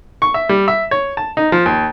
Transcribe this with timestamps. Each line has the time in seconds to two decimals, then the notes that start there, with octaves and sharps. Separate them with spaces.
0.22 C#6
0.34 E5
0.49 G3
0.68 E5
0.91 C#5
1.17 A5
1.37 D#4
1.52 F3
1.66 D#2